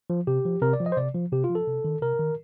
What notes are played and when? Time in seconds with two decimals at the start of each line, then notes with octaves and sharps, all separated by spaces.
0.10 F3
0.27 C3 G4
0.45 F3
0.62 C3 A#4
0.73 D5
0.80 F3
0.86 D#5
0.92 C5
0.97 C3 D5
1.14 F3
1.32 C3 G4
1.44 F4
1.50 F3
1.55 A4
1.67 C3
1.85 D#3
2.01 C3 A#4
2.19 D#3